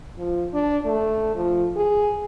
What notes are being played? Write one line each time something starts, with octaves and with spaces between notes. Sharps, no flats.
F3
D4
A3
F3
G#4